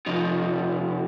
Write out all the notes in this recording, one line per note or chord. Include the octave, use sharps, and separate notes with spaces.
F2 C3 F3 D#4